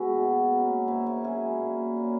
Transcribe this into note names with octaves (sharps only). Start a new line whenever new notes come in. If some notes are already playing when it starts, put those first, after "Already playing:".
Already playing: G#3 B3 E4 F#4
B2
A#3 C#4
G#2 E4
E4
F#3 C#4 G#4
A#2
A#3 C#4